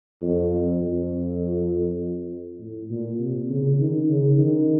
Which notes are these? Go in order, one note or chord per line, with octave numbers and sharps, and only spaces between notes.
F2
F2
A2
A#2
C3
C#3
D#3
C#3
D#3